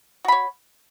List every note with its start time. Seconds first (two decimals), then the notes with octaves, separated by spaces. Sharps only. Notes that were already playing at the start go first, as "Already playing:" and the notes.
0.25 F#4
0.28 B5
0.32 C#5